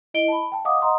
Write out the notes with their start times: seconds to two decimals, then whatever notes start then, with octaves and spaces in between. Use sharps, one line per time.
0.14 E4 D#5 D7 G7
0.28 A5 B5
0.52 G5 A5
0.65 D#5 F5 F#5 D6 D#6
0.81 D#5 F#5 A#5 C6 D#6